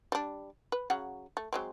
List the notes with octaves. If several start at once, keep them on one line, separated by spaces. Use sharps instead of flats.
G3 D4
B4
C#3 F#3 F#5
A3
F#3 G#3 C4